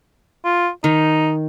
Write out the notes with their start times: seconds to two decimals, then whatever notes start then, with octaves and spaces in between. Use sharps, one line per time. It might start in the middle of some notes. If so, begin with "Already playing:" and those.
0.45 F4
0.84 D#3 D#4